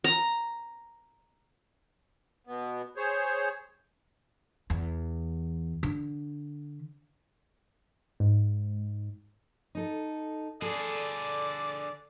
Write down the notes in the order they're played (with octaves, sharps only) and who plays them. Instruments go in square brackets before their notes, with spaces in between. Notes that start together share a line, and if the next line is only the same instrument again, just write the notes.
[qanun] A#5
[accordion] B2 B3
G#4 C5 C#5
[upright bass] E2
D3
[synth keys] G#2
[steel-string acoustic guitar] D#4 A4
[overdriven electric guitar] D3 G#4 [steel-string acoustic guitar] A4 [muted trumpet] D5